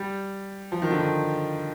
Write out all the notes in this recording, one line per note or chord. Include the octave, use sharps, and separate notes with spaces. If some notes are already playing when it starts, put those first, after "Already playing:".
Already playing: G3
F3
D#3
D3
D#3